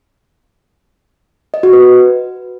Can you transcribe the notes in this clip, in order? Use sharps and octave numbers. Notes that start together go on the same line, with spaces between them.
D#5
F#4
B4